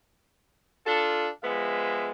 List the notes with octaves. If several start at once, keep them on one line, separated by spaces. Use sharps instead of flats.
D4 F4 A4
F3 G#3 B3 E5